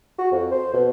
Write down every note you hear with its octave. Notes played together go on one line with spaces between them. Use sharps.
F#4
F2
C5
B2